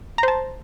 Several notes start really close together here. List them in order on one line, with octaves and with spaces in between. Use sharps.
A#5 C5 A5